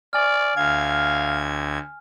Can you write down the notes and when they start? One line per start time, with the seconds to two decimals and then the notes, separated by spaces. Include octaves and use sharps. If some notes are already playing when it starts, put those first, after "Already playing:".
0.13 D5 G#5 F6
0.56 D2 F5 G#6